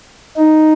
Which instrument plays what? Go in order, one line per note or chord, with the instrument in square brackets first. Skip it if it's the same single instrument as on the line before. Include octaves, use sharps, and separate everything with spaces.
[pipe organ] D#4